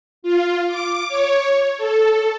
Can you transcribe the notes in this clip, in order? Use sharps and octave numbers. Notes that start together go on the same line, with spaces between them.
F4
D6
C#5
A4